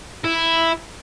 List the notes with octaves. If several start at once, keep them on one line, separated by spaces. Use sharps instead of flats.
E4